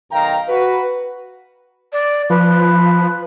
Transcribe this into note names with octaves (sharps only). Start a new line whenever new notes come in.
B1 D#3 F5 G5 A#5
F#4 B4
D5
F3 B4